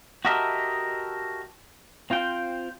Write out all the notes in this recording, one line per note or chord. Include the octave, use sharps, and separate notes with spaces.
F#4 G4 A4 A#4 D#5 E5
C4 F4 C5 G5